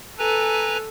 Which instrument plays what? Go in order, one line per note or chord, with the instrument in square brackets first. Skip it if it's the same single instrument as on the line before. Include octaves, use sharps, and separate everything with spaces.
[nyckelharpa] A4 [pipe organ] B4 G#5 A#5